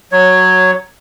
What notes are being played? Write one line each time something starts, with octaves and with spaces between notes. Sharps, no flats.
F#3 C#5